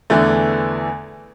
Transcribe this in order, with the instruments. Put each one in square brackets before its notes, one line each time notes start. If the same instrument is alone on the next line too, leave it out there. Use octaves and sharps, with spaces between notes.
[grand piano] E2 D3 E3 A3